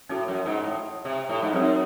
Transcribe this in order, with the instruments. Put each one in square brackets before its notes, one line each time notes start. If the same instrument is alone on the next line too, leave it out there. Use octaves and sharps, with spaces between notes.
[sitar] A2 [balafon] C#4 F#4 A4 C#5
[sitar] F#2
G#2
A2
C3
A2
G#2
[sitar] F#2 [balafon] F#3 C4 D#4 G#4 C#5